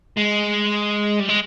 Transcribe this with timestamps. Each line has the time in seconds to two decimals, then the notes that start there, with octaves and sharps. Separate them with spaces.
0.18 G#3
1.20 G3
1.29 G#3